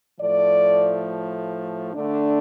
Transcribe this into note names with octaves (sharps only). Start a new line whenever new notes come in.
A2 F3 A3 D5
D3 A3 D4